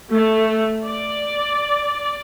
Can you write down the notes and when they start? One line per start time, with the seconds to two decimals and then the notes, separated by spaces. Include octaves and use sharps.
0.13 A3
0.85 D5